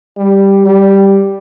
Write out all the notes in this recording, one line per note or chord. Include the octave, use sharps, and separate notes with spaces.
G3
G3